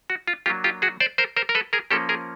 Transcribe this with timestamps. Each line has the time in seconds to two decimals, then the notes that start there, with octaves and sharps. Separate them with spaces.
0.10 F#4
0.28 F4
0.46 F#3 A#3 D4 F4 G4
0.64 F4 G4
0.82 F#4 G#4
1.00 C5 D5
1.18 A#4 C5
1.36 A#4 C5
1.49 A#4
1.55 A4 B4
1.73 G#4 A#4
1.91 F3 A#3 C#4 G4 A4
2.09 G#4 A#4